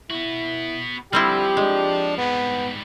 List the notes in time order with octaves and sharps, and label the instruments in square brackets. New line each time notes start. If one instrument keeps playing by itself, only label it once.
[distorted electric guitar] B3 F#4 [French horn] E4
[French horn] D3 [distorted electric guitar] F3 [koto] G3 C4 E4 [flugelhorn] G4
[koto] G#3 [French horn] D4
[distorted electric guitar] G#2 G3 [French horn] B3